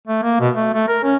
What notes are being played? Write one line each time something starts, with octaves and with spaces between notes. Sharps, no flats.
A3
A#3
B2
A3
A3
A#4
C#4